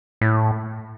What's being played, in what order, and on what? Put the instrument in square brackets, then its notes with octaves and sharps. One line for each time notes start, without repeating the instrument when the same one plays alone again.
[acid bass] A2